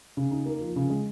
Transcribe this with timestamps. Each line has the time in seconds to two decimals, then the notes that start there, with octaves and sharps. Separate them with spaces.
0.17 C#3
0.31 D#4
0.46 A#3
0.61 F3
0.76 C#3
0.90 G#3